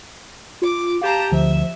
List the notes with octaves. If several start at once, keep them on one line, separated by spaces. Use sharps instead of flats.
F4 D6
G4 F5 A5 A#5
D2 F3 E5